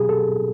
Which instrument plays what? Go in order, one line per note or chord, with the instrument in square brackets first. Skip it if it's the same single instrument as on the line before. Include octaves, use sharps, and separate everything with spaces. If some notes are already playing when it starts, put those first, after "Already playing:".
Already playing: [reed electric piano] B2 F#3 G4 G#4
A4